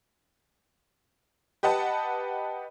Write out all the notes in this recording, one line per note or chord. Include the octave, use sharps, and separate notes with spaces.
G4 B4 D#5 F#5 A5